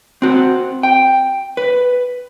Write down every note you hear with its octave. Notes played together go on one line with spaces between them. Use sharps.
C4 F#4
G5
B4